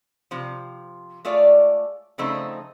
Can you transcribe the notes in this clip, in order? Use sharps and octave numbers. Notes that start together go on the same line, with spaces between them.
C3 F3
G#3 A3 F4 C#5 D5
C#3 F3 A3 C4 D#4